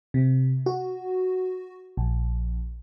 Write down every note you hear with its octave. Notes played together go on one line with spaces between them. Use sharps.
C3
F#4
A#1